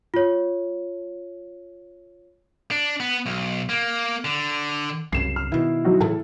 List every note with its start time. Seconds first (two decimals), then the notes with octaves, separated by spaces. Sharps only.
0.14 F4 C#5
2.71 D4
3.00 B3
3.26 B1
3.69 A#3
4.25 D3
5.13 C2 F#2 C#3 C7 E7
5.36 F6
5.52 B2 D#3 E4
5.85 F#3 D#4 F#4
6.00 A2 C#3 E3 A4